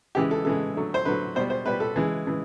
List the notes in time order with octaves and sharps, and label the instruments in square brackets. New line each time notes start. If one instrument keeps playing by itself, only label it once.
[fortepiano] C#3 E3 G#3 G4
A4
C#3 E3 G#3 A4
D3 F#3 A3
C5
D3 F#3 A3 B4
B2 C5
G3
C5
B2 G3 B4
A4
C#3 E3 G#3
C#3 E3 G#3